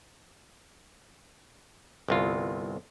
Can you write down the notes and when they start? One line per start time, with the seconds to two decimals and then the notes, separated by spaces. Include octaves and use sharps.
2.08 G1 C2 F4